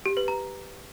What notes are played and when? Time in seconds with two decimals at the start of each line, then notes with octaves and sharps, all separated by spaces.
0.06 G4
0.17 B4
0.28 A#5